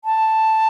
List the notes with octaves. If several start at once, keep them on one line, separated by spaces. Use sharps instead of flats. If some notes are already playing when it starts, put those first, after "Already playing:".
A5